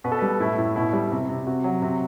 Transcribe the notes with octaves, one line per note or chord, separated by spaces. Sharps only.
B2 B4
A4
B4
G3
A2 E4
A2
B2 E4
G3
C3
C3
C3 F#4
F#3
C3